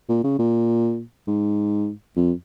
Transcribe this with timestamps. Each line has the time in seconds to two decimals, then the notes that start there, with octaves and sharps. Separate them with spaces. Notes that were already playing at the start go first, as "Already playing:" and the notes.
0.09 A#2
0.24 C#3
0.39 A#2
1.28 G#2
2.16 F2